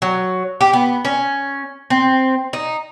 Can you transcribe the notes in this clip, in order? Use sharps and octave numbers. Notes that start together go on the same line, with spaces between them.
F#3
G4
B3
C#4
C4
D#4